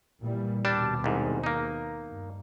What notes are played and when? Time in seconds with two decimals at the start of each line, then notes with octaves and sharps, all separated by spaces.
0.22 A#2 E3 G3
0.65 D#2 B2 G3 D4 A5
1.04 C2 G#2
1.44 A#3 D#4
2.06 G2